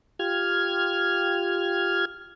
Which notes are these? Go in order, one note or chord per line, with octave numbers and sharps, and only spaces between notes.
F4 G4 F6 G#6